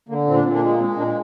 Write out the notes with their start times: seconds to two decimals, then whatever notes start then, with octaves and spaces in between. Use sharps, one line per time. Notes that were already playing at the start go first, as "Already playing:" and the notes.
0.09 D3 A#3
0.26 A#2 C4
0.35 D4
0.43 A#2 C4
0.53 A#3 D4
0.62 G#3
0.69 A#3
0.79 G#3 C4
0.97 A#2 A#3 D4